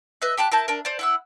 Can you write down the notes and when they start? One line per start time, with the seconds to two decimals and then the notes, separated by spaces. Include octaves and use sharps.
0.22 B4 D#5 E5 F#6
0.37 G4 G5 A5 F#6
0.52 E4 A#4 A5 G6
0.68 D4 A#4
0.85 C5 D5
0.99 E4 F#5 E6